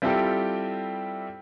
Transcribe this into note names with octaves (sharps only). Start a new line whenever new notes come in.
G3 C4 E4 F4 G4 A4